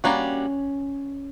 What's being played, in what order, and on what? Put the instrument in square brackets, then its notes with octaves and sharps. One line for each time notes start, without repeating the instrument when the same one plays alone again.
[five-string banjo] G3 A#3 D4 F#4 [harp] C#4